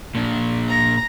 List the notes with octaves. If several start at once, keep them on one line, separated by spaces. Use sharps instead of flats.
A#2 D4
A#5 A#6